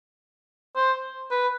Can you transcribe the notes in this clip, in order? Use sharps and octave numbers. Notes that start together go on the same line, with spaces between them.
C5
B4